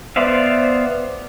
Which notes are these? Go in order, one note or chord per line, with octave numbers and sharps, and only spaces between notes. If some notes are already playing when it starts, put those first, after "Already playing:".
B3 C5 D5 E5 F5